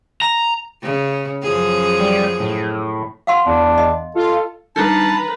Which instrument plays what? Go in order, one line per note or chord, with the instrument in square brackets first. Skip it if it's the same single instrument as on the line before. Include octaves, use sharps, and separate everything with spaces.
[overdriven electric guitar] A#5
[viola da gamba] C#3
F#2 F3 G#4
[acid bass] G3
A2
[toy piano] F5 F#5 C6
[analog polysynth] E2 [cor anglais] D4
[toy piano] D#5
[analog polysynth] F4 [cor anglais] A4
[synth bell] G3 D4 D#4 [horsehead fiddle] B4 A#5 [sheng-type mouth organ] A5